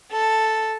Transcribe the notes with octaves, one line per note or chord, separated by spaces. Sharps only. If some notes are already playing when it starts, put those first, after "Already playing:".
A4